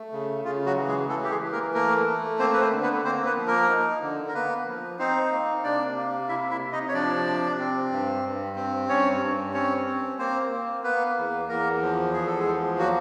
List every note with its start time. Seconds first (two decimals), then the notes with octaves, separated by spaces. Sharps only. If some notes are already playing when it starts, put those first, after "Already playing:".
Already playing: A3
0.12 C#3
0.44 C#3 F4
0.66 F#3 F#4
0.77 E3
0.87 G#3 G#4
1.09 E3 A3 A4
1.24 G4
1.31 G#3 G#4
1.42 E3
1.52 A#3 A#4
1.74 A3 A#3 A#4
2.07 A3
2.39 A#3 C4 C5
2.53 B4
2.61 C4 C5
2.72 D3
2.82 B3 B4
3.04 A#3 C4 C5
3.25 B3 B4
3.37 F3
3.47 A#3 A#4
3.69 D#4
4.02 D3
4.28 A#4
4.34 A#3 B3 B4
4.67 F3
4.99 C4 D#4 C5
5.31 A#3
5.64 C3 D4 D5
5.96 A#3
6.29 C3 E4 E5
6.50 E4 E5
6.62 C3
6.73 D#4 D#5
6.88 C#5
6.94 F3 D4 D5
7.27 C3
7.59 C4
7.91 G2
8.24 G2
8.56 C4
8.89 G2 C#4 C#5
9.21 G2
9.53 C4 C#4 C#5
9.86 C4
10.18 A#3 C4 C5
10.51 A#3
10.83 A#3 B3 B4
11.16 E2
11.49 E2 A#3 A#4
11.81 F3
12.14 E2 G#4
12.27 A4
12.39 G#3 G#4
12.47 F3
12.79 F#3 A#3 F#4